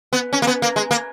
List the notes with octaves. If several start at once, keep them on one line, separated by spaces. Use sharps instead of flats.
B3
C#4
A#3
B3
A#3
G#3
A#3